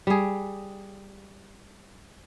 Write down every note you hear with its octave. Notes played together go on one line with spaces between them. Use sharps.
G3 G#4